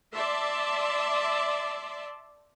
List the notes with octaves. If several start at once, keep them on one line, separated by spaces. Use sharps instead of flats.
D5 E5 A5 C6